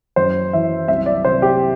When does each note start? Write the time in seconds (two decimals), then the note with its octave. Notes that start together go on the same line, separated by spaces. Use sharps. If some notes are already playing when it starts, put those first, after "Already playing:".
0.16 F#2 C5
0.53 E3 E5
0.88 C2 E5
1.06 D5
1.25 C3 C5
1.42 G4